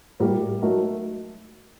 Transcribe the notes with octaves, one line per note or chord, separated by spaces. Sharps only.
A2 G3 A#3 F#4 A#4
F#3 A3 D#4 F#4 A#4